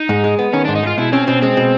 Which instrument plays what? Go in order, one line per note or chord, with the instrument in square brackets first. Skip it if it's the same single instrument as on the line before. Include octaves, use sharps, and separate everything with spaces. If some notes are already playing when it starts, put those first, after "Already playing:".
Already playing: [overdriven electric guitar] D#4
[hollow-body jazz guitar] G#2
G#3
B3
[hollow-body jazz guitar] D#3 [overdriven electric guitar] C#4
[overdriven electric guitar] D4
[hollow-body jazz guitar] G#2
[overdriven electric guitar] D#4
[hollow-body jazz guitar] G#3 [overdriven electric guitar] F4
[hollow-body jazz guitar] B2 [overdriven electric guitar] E4
[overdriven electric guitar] C4 [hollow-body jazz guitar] C#4
[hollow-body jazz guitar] B2 [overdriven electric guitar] C4
[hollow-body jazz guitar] G#3 [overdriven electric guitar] C4
[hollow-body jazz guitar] B2